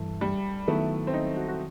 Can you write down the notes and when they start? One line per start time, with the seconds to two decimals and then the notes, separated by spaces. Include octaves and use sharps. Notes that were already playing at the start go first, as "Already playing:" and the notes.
Already playing: G2 E3 A3
0.21 G3
0.67 D#3 F#3 A3 B3 E4
1.07 C4
1.14 D#4
1.37 F#4
1.48 F#4